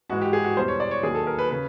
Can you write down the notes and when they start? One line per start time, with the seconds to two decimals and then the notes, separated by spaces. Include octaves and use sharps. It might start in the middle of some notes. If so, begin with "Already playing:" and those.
0.09 G#2 E3 G#3 F#4
0.22 G4
0.33 G#4
0.44 F#4
0.56 E2 B2 G3 C5
0.68 C#5
0.80 D5
0.91 C#5
1.03 D#2 D#3 F#3 G#4
1.15 A4
1.27 A#4
1.39 B4
1.50 C#3 B4